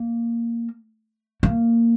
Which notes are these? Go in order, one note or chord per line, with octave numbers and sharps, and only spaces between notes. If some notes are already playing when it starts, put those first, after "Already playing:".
Already playing: A#3
A#3